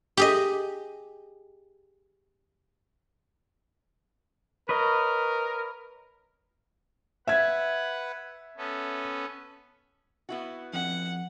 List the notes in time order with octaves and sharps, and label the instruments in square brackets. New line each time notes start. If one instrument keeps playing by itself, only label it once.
[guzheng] G4 G#4 D#5
[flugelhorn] A#4 [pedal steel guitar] B4 C#5 D#5
[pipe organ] B4 F#5 [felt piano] E5 G#6
[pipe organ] B3 C#4 A4
[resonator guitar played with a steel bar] B3 E4 F#4
[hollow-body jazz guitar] F2 [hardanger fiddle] F#5